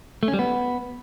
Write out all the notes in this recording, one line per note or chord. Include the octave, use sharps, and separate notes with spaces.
A3
C#4
G3
B3